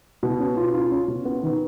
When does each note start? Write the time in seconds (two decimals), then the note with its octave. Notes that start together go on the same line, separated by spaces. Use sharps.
0.23 B2
0.40 C#4
0.57 F4
0.74 F4
0.91 C#4
1.08 B2
1.25 B3
1.43 D#3